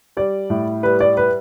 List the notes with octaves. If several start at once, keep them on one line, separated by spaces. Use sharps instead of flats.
G3 D5
A2
G3 B4
D5
B4